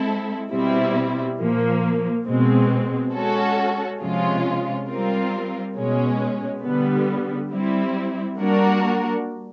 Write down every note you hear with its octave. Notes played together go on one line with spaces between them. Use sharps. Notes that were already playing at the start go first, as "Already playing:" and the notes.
Already playing: G#3 C4 E4 A4
B2 G3 C4 E4
A#2 F3 A#3
B2 G#3 C4
G#3 C#4 F#4 A4
C3 F3 G#3 C#4 F4
G3 C4 F4 A#4
B2 G#3 C#4
D3 G3 B3
G3 C4 E4
G3 A#3 D4 F#4 A#4